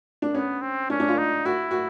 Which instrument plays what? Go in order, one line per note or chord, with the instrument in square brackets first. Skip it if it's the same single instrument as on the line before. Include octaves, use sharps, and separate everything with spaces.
[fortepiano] D4
[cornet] B3 [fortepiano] C#4
[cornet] C4
[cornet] C#4 [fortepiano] D4
[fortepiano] D4
F4
[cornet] D#4
[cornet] E4 [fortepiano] F#4
[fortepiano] F#4